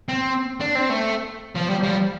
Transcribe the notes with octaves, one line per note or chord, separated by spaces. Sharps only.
C4
D4
C4
A3
F3
G3
F3
G3